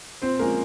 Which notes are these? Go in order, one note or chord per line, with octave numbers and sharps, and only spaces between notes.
A#2 C4 C5
F3 G#3 A#3 C#4 F4 A#4